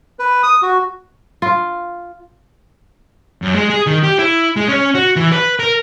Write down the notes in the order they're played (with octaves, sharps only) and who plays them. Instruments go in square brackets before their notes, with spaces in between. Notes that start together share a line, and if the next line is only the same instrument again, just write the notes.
[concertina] B4
D#6
F#4
[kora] F4
[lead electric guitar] F#2
G#3
G#4
D#3
G4
E4
G#3
C#4
F#4
E3
B4
A#4